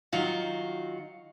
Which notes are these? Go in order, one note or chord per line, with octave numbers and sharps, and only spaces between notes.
D#3 F#3 F4 F#4